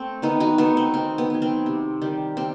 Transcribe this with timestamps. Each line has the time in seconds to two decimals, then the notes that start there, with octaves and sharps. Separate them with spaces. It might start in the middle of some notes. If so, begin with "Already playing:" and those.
Already playing: A3 C4
0.22 D#3 B3 D#4
0.40 D#4 F#4
0.58 A3 B3 D#4
0.77 C4
0.94 D#3 C4
1.18 B3
1.30 F#3 B3
1.42 C4
1.66 C3
2.02 D#3 G3
2.37 C3 C4